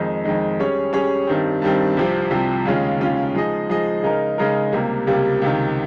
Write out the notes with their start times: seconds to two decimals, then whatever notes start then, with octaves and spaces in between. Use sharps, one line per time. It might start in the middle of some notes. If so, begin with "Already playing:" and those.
Already playing: F2 D#3 G#3 D#4
0.24 F2 D#3 G#3 D#4
0.59 G3 C#4 G#4 C#5
0.93 G3 C#4 G#4 C#5
1.27 G2 D#3 G3 C4
1.62 G2 D#3 G3 C4
1.97 C2 C3 F3 C4 G4
2.31 C2 C3 F3 C4 G4
2.65 D#2 C#3 G#3 C#4 F4
3.00 D#2 C#3 G#3 C#4 F4
3.35 F3 G#3 D#4 G#4 D#5
3.69 F3 G#3 D#4 G#4 D#5
4.03 C#3 G#3 D#4 A#4
4.38 C#3 G#3 D#4 A#4
4.72 C#2 C3 G3 A#3
5.07 C#2 C3 G3 A#3
5.42 C#2 C3 D#3